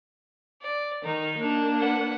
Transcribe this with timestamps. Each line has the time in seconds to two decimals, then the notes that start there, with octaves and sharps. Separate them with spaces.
0.62 D5
1.04 D#3 D#4
1.38 A#3 D4
1.80 B4 F#5